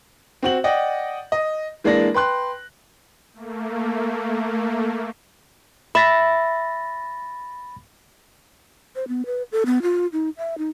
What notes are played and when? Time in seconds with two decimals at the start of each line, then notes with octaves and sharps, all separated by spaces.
0.43 C4 F#4 F#7
0.64 D5 D#5 F#5 G5
1.32 D#5
1.84 E3 G#3 A#3 D4 D5 A#6
2.14 B4 G5 C6 F#6
3.34 A3 A#3
5.95 E5 B5 A6 A#6
8.96 C5
9.08 B3
9.26 B4
9.52 A4
9.66 B3
9.82 F4
10.13 D#4
10.37 E5
10.58 D#4